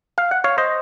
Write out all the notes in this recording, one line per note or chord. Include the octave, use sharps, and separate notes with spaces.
F5
F#5
C#5 F5
C5 D#5